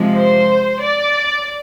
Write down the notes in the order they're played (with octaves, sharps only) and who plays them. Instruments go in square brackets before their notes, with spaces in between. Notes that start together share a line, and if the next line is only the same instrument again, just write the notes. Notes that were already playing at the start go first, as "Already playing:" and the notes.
Already playing: [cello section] C3 F3 G#3
[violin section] C5
D5